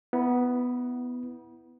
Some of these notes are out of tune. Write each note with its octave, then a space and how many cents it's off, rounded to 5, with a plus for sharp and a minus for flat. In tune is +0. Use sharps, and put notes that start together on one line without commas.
B3 +5 E4 +0 B5 -40